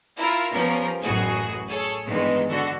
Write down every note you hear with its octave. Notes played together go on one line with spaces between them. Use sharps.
E4 F4 A#4
F3 G3 B3 C#4 A#4
A1 F#2 A2 F#4 G#4
G#4 A4 C#5
G2 D#3 E3 G#3 B3
D3 F#4 A4